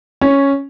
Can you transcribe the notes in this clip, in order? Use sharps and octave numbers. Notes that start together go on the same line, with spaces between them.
C#4